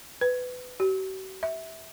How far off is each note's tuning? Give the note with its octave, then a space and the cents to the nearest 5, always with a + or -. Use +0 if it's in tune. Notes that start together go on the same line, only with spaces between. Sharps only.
B4 +20
F#4 +45
E5 -15